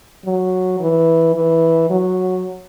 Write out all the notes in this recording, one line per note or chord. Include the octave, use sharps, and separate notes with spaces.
F#3
E3
E3
F#3